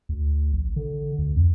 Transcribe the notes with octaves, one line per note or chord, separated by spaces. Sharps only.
D2
A#1
D3
D2
F2